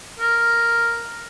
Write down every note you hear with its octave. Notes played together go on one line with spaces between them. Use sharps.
A#4